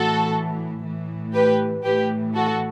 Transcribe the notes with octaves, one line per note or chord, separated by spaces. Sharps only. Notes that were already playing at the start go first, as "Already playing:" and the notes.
Already playing: A2 E3 F#4 A4
A2 E3
G4 B4
A2 E3 G4 B4
F#4 A4